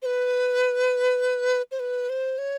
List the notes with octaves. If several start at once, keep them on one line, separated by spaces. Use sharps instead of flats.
C5
B4
C5
B4
C5
C#5